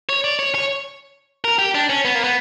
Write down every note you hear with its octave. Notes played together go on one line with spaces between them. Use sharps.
C#5
D5
C#5
C#5
A#4
G4
D4
C#4
B3
A#3
B3